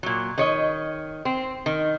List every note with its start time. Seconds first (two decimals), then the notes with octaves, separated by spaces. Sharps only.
0.03 A#2 F#3
0.38 D#3 C#5 D#5
1.25 C4
1.66 D#3